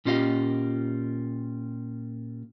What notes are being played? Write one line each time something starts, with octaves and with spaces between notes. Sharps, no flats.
A#2 C#4 F4 G4 D#5 F5